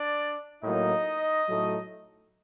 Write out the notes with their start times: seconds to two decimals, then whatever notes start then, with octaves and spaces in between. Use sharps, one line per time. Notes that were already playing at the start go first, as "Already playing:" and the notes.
Already playing: D4 D5
0.62 A2 F#3 A#3 D#4 D#5
1.48 A2 F#3 A3 D#4